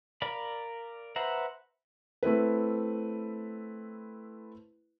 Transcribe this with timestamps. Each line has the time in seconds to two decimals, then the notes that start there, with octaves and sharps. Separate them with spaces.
0.22 A#4 D5 F5 B5
1.16 B4 C5 E5 F#5 A#5
2.23 A3 C4 E4 B4